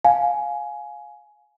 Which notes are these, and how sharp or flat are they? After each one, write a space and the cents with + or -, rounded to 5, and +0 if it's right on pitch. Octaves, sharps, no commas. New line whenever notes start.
F5 +15 G#5 +15